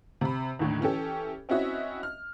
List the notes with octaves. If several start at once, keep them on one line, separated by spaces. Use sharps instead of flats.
C3 B5
D#2 A2 D3
E3 C#4 G4 A4
C4 C#4 E4 F#4 D#5 E5
F6